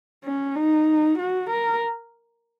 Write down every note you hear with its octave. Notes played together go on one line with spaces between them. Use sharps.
C#4
D#4
F#4
A#4